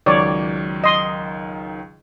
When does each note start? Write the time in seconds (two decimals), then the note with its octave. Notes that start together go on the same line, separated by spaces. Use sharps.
0.06 C#2 D#3 F#3 C#5 D5
0.84 D#5 C6